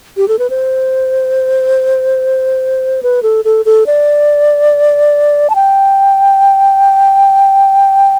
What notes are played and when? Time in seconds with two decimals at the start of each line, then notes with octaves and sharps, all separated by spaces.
0.17 G4
0.28 A4
0.39 B4
0.50 C5
3.03 B4
3.23 A4
3.45 A4
3.65 A4
3.86 D5
5.50 A5
5.55 G5